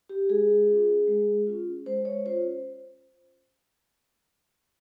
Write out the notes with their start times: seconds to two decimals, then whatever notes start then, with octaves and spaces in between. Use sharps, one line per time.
0.09 G4
0.30 G#3 G#4
0.69 C#4 F4
1.08 G#3
1.47 C#4 F4
1.86 G#3 C5
2.05 C#5
2.25 C#4 F4 C5